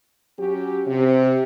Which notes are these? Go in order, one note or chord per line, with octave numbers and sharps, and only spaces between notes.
F#3 C#4 G4
C3